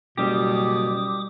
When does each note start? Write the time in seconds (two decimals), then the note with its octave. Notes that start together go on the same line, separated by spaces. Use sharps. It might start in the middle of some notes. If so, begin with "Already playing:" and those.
0.18 F#1 B2 G3 G4 D6 D#6